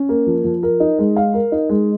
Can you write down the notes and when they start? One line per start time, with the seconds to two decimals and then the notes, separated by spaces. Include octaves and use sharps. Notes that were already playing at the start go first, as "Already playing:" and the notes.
Already playing: C#4
0.09 A#3
0.27 F3
0.44 F3
0.63 A#4
0.80 D#4
0.99 G#3
1.16 F5
1.34 A#4
1.52 D#4
1.69 G#3